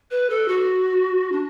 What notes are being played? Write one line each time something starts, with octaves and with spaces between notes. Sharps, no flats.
B4
A4
F#4
D4